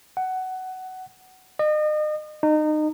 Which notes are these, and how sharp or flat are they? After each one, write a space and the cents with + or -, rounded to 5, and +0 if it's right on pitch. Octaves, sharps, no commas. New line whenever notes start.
F#5 +15
D#5 -35
D#4 -25